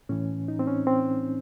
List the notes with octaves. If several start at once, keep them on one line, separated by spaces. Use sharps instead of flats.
A2 E3 C#4
D#4
C4
C#4
C4